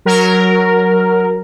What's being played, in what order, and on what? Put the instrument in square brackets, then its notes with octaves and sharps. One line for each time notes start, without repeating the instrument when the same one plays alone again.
[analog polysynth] F#3 A#4